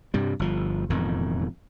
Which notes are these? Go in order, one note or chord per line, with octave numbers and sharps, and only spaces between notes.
G2 C3 G3
G1 F3
E1 F2 A2 D#3